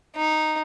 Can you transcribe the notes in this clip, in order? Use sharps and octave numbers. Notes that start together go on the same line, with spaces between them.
D#4